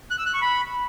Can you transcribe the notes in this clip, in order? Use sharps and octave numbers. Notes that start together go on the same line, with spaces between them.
F#6
E6
F#6
C#6
B5